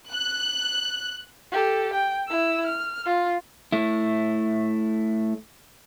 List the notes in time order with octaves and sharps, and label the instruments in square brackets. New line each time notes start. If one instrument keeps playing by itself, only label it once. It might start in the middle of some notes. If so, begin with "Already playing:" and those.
[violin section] F#6
[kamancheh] G4 A4
G5
E4 E6
F6
F4
[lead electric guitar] A3 E4